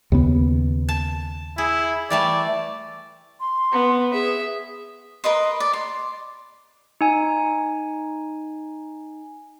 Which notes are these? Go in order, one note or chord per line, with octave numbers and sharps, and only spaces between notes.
D#2 C#3 B3
A5
E4 G#4
E3 G3 A3 D5
C6
B3
G#4 E5
A#4 B4 D#5 C6
D5
C6
D#4 G#5